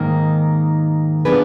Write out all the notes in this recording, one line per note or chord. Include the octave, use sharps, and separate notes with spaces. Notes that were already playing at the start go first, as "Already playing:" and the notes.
Already playing: G#2 D#3 A#3
F3 B3 D4 G#4 B4